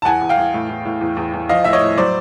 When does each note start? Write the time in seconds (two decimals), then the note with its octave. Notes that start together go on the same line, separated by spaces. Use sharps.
0.02 A5
0.05 E2 F#5 G#5
0.22 E2
0.29 F5 G5
0.38 E2
0.54 A2
0.70 A2
0.85 A2
1.01 E2
1.17 E2
1.33 E2
1.49 F3 D#5 F5
1.64 A2 E5
1.73 C#5 D#5
1.81 A2
1.98 F#3 C5 D5